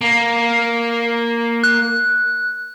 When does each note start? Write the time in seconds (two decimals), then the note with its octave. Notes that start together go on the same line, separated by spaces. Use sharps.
0.01 A#3
1.63 F#6